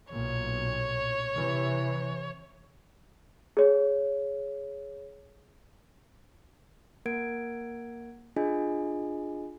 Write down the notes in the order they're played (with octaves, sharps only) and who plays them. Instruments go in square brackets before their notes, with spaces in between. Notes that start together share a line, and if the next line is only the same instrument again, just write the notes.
[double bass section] B1 A#2 [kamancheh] C#5
[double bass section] C3 E3
[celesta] G#4 C#5
[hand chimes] A#3 A#4 F#5 G#6 D7
D4 F4 G#4 D#5 G#5